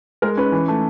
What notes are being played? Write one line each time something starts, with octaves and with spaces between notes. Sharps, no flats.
G#3 A#4
C#4 B4
E3
A3